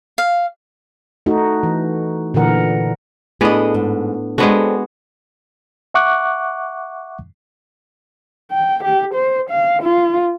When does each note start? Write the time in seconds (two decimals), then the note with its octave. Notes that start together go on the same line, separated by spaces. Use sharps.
0.18 F5
1.26 A3 D#4 F#4
1.63 E3
2.34 A#2 D3 E3 A#4 F#5
3.41 A2 B3 D4 G#4 D#5
3.74 G#2
4.38 G#3 B3 C4 D4 F#4 A4
5.94 E5 F#5 C#6 D6 F#6
8.52 G5
8.84 G4
9.14 C5
9.50 F5
9.83 F4